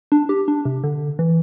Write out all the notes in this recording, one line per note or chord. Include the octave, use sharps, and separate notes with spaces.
D4
G4
D4
C3
D3
E3